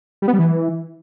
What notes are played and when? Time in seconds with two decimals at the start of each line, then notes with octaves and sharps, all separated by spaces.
0.22 G3
0.28 B3
0.33 G3
0.39 E3